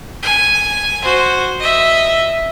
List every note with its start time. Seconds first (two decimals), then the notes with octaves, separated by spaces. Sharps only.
0.23 G#5
1.03 F#4 C5
1.60 D#5 E5